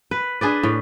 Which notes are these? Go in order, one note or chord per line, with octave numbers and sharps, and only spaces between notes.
B4
D4 G#4 B4 D5
A2